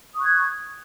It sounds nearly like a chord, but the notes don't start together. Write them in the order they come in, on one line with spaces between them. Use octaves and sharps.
D#6 C#6 F#6 G#6